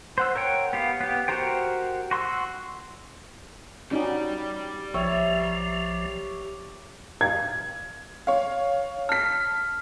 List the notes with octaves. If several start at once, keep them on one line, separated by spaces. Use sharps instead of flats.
C5 F#5 E6
A#4 C#5 F#5 G5
B3 G4 F5
B3 G4
F#4 G4 A#4 C5 G5
F#4 C6 C#6 E6
C#4 D#4 F#4 G4 D5
A#1 F3 C#5 E5 G5
G#6
C#5 F5
A5 F6 B6